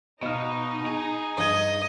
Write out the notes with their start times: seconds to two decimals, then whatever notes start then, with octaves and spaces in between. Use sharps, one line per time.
0.22 B2 D#4 D#5 F5 F6
0.86 G#4
1.38 G2 D#5 G#6